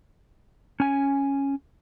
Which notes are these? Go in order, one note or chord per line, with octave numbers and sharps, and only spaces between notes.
C#4 G#5